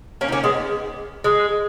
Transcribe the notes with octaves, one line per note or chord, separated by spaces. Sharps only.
A#3 C#4
D#4
A#3 C#4
G#3 B3
G#3